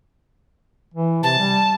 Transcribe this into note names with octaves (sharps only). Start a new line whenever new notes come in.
E3
C3 A5
G3